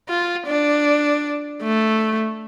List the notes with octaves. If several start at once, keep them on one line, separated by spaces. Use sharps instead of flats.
F4
D4
A3